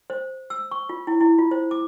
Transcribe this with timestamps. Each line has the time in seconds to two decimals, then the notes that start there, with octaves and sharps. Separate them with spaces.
0.10 C5
0.50 E6
0.71 C#6
0.89 F4
1.07 E4
1.21 E4
1.39 F4
1.51 C5
1.71 D6